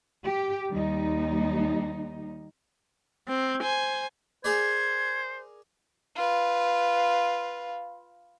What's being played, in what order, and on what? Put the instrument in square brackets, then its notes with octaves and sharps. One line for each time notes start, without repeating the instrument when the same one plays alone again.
[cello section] G4
D#2 G3 D#4
[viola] C4
C5 G#5
[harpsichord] G#4 A#4 D5 [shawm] C5 [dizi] G#6
[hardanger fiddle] F4 B4